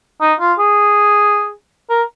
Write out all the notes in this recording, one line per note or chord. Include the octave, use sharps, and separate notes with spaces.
D#4
F4
G#4
A#4